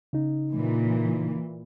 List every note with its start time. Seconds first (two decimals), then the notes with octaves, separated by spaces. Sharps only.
0.13 C#3 D#4
0.55 A#2 E3